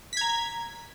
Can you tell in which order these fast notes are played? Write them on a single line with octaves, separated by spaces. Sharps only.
B6 G#6 A#5